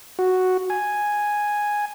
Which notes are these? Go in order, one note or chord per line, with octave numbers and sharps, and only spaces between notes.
F#4
G#5